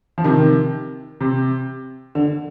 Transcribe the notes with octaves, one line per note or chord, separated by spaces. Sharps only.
F3
C3 D#3
C3
D3